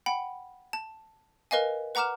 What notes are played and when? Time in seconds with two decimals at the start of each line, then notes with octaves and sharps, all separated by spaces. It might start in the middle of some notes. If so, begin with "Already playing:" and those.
0.06 F#5 G5 B5
0.73 A5
1.51 A#4 B4 D#5 F5 G#5
1.95 B4 F#5 A#5 D6 F6 E7